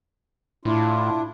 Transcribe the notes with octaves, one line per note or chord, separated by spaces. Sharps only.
A2 D4 E4 F4